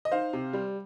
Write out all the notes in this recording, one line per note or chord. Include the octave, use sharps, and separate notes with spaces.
D#5
D#4 C5 F5
C3
G3